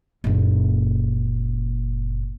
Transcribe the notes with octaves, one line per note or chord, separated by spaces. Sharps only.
F#1 A#2